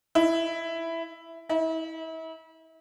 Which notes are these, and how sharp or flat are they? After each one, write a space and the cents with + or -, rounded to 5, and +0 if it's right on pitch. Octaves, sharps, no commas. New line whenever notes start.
E4 +5
E4 -35